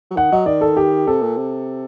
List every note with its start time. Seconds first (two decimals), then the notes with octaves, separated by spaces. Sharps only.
0.11 F#3
0.16 D#3 F#5
0.32 F#3 D#5
0.46 D#3 D5
0.61 A4
0.77 G4
1.07 C3 A4
1.21 A#2
1.36 C3